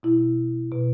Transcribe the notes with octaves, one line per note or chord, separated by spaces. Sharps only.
B2 E4
B2